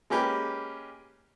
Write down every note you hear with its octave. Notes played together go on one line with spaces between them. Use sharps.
G#3 A#3 C#4 G4 B4